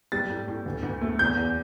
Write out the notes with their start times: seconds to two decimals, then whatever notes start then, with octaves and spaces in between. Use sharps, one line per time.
0.12 G3 A6
0.30 A2
0.48 A2
0.66 D2
0.83 D2
1.01 A3
1.19 E2 G6
1.37 E2